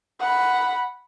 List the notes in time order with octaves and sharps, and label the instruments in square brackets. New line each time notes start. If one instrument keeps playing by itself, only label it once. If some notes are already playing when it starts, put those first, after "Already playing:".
[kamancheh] F#5 B5